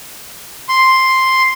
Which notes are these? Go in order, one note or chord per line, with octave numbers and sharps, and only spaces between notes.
C6